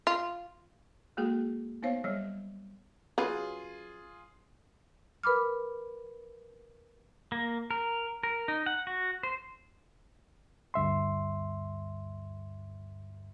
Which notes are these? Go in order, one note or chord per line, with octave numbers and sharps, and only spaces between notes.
F4
G#3 A#3 F#4 G#4 A4
B3 D#4 C5 C#5 F5
F#3 G3 C#5
C#3 F#3 F4 G#4 B4
A#4 B4 B5 D6 F6
A#3
A#4
A#4
D#4
F#5
F#4
C5
D2 G2 E5 C6